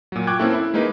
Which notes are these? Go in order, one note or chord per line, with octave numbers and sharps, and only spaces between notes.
A#2 F#3
G5 C#6 D6 F#6 G#6
A#3 C4 C#4 E4 A4
E4
G#3 A#3 D#4 B4